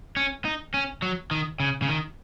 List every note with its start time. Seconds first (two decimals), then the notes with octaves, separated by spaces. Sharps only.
0.16 C#4
0.45 D#4
0.74 C#4
1.02 F#3
1.31 D#3
1.60 C#3
1.82 C#3
1.88 D#3